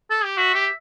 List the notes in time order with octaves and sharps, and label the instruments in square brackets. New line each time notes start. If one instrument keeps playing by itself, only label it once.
[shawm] A4
G4
[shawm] F#4 [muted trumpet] E5
[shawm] G4